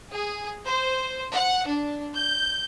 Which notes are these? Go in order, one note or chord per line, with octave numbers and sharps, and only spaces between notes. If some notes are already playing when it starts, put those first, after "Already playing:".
G#4
C5
F#5
D4
G6